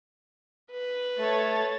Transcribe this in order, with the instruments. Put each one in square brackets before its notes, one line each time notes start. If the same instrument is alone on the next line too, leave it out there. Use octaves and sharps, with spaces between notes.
[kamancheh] B4
[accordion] A3 [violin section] A4 C#5 A6